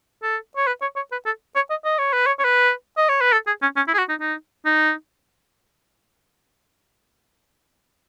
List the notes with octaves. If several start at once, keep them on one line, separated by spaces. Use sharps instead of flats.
A4
C#5
B4
C#5
C#5
B4
A4
C#5
D#5
D#5
C#5
B4
C#5
C#5
B4
D#5
C#5
B4
A4
G#4
C#4
C#4
E4
G#4
F#4
D#4
D#4
D#4